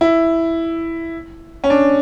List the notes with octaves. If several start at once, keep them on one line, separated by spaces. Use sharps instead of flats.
E4
C#4
D4